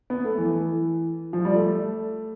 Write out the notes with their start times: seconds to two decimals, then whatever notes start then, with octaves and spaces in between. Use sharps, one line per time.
0.10 B3
0.25 A3
0.38 E3
1.33 F3
1.45 G3
1.55 A3